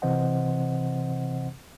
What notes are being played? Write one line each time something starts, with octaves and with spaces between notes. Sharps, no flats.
C3 E3 C4 C5 D#5 F#5